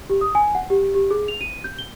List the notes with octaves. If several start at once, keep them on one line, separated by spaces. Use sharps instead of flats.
G4
D#6
G#5
F#5
G4
G4
G#4
F7
D#7
G6
G7